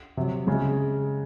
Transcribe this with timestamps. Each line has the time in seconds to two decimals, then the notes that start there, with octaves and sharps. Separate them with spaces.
0.17 C3 F#3
0.47 C#3 G#3